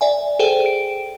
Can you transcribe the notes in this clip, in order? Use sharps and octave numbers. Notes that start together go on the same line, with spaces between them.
D5 E5 G#5
G#4 A4 C5 G5
D7